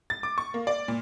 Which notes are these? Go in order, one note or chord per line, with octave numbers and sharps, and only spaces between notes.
A6
D6
C#6
A#3
D5
A#2